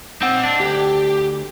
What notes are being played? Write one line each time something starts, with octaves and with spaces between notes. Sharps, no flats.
C4 D#4 F#5
D4
D2 G4